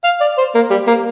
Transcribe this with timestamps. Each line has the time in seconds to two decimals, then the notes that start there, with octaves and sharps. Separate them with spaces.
0.04 F5
0.21 D5
0.38 C5
0.55 A#3
0.70 G3
0.87 A#3